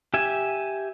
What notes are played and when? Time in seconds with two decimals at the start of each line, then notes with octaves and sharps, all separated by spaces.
0.14 G4 E5 G#5